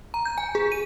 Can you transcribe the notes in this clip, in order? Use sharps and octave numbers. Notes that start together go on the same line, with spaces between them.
A#5
G6
G#5
G#4
D#7